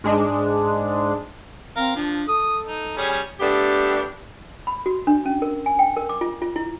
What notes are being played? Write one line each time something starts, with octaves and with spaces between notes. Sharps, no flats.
G#2 G#3 D4
C4 A#4 F5
F3 D4
A4 D#6
D#4
G3 C#4 G#4
A3 B3 D4 G4
B5
F#4
D4
C#4
A#4
G#5
G5
A#4
D6
F4
F4
E4